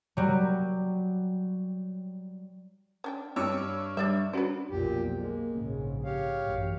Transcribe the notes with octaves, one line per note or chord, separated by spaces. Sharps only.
F#3 G3
C#4 D4 G5
G2 D4 C#5 D#5 C#6 D6 E6
G3 D4 D5 E5
C#4 D4 F#4 B4 C5
B1 F2 A#2 G4
G#3 A#3
A#1 G#2 C#3
G4 C#5 F5
A1 F#2